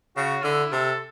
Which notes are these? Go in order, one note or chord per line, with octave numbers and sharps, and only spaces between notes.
C#3 F#4
D3 E4
C3 A4